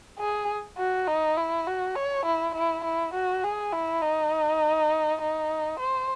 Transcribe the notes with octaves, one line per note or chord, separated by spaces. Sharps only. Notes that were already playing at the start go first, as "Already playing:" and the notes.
G#4
F#4
D#4
E4
F#4
C#5
E4
E4
E4
F#4
G#4
E4
D#4
D#4
C5